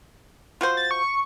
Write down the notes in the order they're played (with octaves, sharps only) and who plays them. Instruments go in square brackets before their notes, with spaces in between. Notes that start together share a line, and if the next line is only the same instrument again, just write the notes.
[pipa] F4 F#4 C5
[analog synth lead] A6
C#6